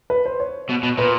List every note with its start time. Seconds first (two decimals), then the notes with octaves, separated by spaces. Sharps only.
0.10 B4
0.26 C5
0.40 C#5
0.70 B2
0.83 B2
0.98 A#2 B4